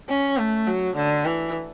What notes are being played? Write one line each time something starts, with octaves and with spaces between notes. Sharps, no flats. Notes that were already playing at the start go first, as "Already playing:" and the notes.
C#4
A3
F#3
D3
E3